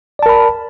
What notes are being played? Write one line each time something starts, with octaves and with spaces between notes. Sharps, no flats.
A#4 D5 A5 B5